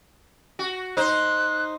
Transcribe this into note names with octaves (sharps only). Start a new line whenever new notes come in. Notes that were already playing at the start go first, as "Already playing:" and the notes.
F#4
D#4 C5 F#6